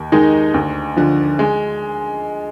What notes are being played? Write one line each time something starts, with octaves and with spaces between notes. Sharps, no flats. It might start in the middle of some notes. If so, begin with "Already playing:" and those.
Already playing: D#2
D#3 G#3 D#4
D2
D3 F3
G#3